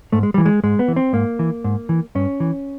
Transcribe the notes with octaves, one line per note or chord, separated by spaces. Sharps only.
G#2 A3
G#3
E3 G3
G#3
G#2 G#3
B3
E3
C4
G#2 A#3
E3
G#2
E3
G2 C#4
E3